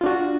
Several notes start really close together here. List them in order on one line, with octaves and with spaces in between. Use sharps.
F4 D4 F#4